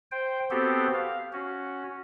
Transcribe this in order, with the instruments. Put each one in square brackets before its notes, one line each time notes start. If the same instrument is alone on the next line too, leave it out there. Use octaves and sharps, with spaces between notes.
[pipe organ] C5 G5
B3 C4 F#4 G4 A4 C5
F5
C#4 F#4